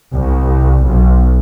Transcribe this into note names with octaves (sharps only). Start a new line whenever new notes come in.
C2
B1